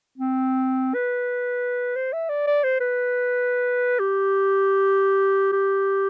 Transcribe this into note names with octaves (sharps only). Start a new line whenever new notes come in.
C4
B4
C5
E5
D5
D5
C5
B4
G4
G4